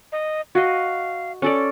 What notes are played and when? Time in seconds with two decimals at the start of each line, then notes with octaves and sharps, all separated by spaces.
0.12 D#5
0.55 F#4 D#5 F5
1.42 C#4 A4 D5